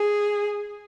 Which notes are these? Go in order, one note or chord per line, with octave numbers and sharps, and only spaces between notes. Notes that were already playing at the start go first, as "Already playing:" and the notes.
Already playing: G#4